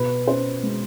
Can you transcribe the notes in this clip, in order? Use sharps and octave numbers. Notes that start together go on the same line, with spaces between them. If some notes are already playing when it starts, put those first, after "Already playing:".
Already playing: B2 B4
C#4 C5
G#3